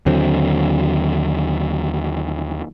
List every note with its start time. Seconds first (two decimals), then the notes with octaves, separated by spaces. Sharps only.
0.06 D#2 D3 F#3 C4